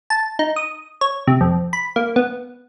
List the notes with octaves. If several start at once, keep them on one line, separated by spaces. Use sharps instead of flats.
A5
D#4
D#6
C#5
C3
F2
B5
A#3
B3